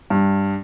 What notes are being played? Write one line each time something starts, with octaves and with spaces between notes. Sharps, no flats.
G2